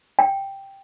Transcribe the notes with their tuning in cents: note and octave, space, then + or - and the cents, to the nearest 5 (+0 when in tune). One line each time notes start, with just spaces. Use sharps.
G5 +0